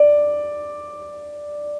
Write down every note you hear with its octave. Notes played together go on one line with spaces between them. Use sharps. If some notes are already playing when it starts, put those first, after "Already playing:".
Already playing: D5